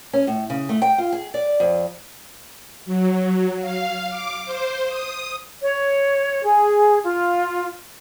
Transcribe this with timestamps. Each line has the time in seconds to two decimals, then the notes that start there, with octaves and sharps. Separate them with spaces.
0.13 C#4
0.27 A2
0.50 C#3
0.69 A3
0.82 G5
0.98 F4
1.13 G#4
1.34 D5
1.60 F2
2.85 F#3
3.61 F5
4.09 D6
4.45 C5
4.88 D#6
5.62 C#5
6.43 G#4
7.03 F4